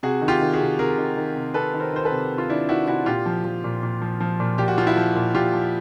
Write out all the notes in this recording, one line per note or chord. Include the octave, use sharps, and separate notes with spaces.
C3 F#4 G#4
D#3
F4 G4
D#3
F#4 G#4
C3
C3 G#4 A#4
D#3
D#3
C3
C3 A4 B4
D#3
A#4 C5
D#3 C5
A4 B4
C3
C3
F4
D#3 D4 E4
D#3 E4 F#4
C3 E4 F#4
A#2 F4 G4
F3
F3
A#2
A#2
F3
F3
A#2
A#2 G4
F#4
F3 F4
E4 F#4
F3
A#2
A#2 F4 G4
F3